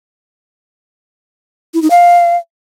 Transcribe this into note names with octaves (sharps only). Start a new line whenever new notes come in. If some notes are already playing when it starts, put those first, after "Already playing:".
E4
D#4
F5